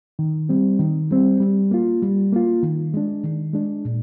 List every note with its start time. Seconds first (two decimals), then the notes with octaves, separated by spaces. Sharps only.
0.19 D#3
0.49 G3 C4
0.79 D#3
1.11 G3 C4
1.40 G3
1.71 A#3 F4
2.02 G3
2.32 A#3 F4
2.63 D#3
2.94 G#3 D4
3.24 D#3
3.53 G#3 D4
3.85 A#2